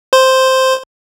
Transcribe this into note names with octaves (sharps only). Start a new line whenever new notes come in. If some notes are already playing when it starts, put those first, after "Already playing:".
C5 C6